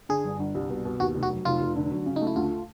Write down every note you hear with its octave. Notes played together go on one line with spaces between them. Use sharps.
D3 G#4
G1
G1
C2
B2
B2
D#2 F#4
F1
F#4
F#3
F1 F4
F1
D3
F#3
C#3
D#4
A3
E4
D2 F4